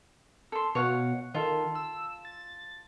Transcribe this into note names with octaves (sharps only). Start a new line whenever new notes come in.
A4 C6
B2 C#5 F5 F#5
D#3 F4 A4
E6
A6